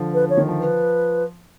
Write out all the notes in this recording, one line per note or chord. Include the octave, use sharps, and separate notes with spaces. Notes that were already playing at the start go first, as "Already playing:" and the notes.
Already playing: D3 F3
B4
C#5
D#3
F3
B4